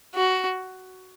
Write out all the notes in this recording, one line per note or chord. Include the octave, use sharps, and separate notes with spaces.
F#4